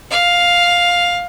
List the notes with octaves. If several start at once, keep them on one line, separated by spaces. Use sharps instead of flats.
F5